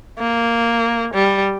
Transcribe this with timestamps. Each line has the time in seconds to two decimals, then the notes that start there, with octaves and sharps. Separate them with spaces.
0.18 A#3
1.14 G3